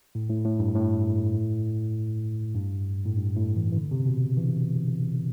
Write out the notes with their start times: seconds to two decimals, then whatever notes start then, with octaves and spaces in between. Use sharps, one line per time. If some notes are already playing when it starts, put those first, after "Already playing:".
0.15 A2
0.30 A2
0.45 A2
0.60 G2
0.75 A2
2.55 G2
3.05 A2
3.17 G2
3.36 A2
3.56 E3
3.72 E3
3.77 D3
3.91 C3
4.06 B2
4.37 E3